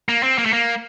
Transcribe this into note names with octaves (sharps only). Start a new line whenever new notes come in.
A#3
C4
A#3
A3
A#3